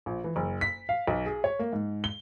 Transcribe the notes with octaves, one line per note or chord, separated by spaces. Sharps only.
A#1
E3
F#1
B6
F5
B1
G#4
C#5
A#3
G#2
G7